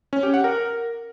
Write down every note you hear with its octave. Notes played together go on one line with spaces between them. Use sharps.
C#4
G4
F#5
A#4